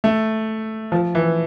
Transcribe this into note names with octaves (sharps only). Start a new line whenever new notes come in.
A3
F3
E3